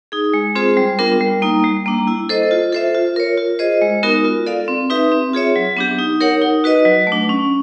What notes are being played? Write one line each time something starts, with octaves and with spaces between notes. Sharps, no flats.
D#4 G#4
G#3
C4 F4 G#4 C5
G3
B3 D4 F4 A#4
G3
A#3 D#4
G3
A#3 D4
E4
A4 C5 D#5
F4
A4 C5 E5
F4
A#4 C#5
F4
G#4 C5 D#5
G#3
B3 D#4 F#4 A#4
F4
A4 D5 F5
C4
D#4 G4 B4 E5
C4
F4 G#4 C#5 E5
F#3
B3 D4 G4
D#4
G4 A#4 C#5 F#5
D#4
F#4 B4 D#5
F#3
A3 D4
C#4